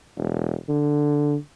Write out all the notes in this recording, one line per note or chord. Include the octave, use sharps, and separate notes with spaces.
E1
D3